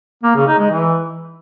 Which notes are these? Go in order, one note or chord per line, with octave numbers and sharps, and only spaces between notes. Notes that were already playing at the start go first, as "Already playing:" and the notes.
A#3
C#3
D#4
G#3
E3